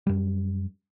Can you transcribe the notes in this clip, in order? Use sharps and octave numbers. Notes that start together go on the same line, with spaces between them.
F#2 G3